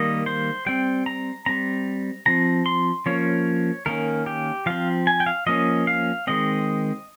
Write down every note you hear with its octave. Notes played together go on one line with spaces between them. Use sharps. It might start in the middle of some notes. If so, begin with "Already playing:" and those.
Already playing: D#3 G3 A#3 D#5
C5
G3 C4 G5
A#5
G3 C4 A#5
F3 C4 A#5
C6
F3 A#3 C#4 C#5
D#3 A#3 C#4 A#4
G4
F3 C4 F5
G#5
G5
F5
F3 A#3 C#4 D#5
F5
D#3 G#3 C4 D#5